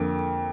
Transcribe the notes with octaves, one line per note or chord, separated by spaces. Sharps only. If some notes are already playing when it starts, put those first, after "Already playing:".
Already playing: F2 D3 A#3